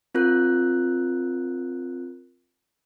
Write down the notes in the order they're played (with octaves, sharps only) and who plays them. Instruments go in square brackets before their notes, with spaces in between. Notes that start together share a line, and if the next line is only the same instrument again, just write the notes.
[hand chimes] C4 F4 A#4 F#6